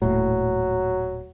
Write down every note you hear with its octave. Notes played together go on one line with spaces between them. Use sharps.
D#1 A2 F#3